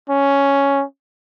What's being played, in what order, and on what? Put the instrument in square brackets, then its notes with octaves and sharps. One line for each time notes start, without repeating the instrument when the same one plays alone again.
[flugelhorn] C#4